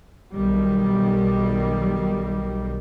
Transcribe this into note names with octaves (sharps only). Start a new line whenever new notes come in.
B1 D#3 G3